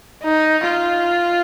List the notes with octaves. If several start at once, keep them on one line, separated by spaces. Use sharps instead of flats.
D#4
F4